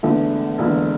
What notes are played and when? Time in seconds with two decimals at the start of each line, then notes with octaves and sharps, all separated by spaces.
0.03 E1 E2 D3 A3
0.58 E1 E2 D3